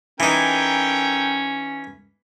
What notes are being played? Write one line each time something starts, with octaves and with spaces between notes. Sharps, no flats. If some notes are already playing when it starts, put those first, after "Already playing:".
E3 C#4 D#4 A4 A#4 G5